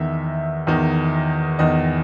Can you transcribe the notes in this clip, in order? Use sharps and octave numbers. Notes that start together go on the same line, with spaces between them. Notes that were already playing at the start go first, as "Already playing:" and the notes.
Already playing: E2 D#3 E5
E2 D#3
E2 D#3 D#5